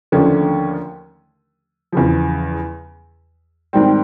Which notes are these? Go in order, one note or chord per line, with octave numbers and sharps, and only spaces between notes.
D#2 D3 F3 A3 C#4
E2 C#3 F3
G#2 D#3 G3 C4